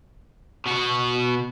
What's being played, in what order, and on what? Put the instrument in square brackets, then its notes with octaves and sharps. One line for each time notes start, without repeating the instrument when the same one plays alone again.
[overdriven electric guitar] B2 F#4